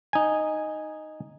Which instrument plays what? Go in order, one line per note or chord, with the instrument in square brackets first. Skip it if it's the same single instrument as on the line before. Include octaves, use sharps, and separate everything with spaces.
[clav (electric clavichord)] D#4 G#5